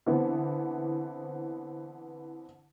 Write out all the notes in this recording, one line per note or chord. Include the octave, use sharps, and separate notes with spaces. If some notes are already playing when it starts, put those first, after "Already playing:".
D3 E3 B3 C4